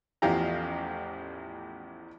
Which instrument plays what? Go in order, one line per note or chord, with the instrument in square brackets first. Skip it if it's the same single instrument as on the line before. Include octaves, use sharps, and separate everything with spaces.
[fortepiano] A1 E2 F3 G4 F5 A#5